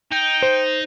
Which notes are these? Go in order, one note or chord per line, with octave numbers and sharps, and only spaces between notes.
D#4 G5
C5